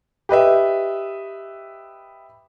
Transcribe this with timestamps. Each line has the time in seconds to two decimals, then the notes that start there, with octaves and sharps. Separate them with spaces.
0.29 G4 B4 D#5 E5